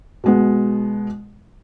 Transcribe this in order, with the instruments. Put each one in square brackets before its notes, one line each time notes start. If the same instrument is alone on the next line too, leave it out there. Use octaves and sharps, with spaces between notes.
[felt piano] B2 G#3 B3